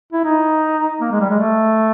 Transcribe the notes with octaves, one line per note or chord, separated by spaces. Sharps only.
E4
D#4
A#3
G#3
G3
G#3
A3